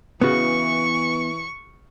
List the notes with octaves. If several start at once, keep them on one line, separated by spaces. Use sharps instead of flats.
C#3 E3 B3 F#4 C#6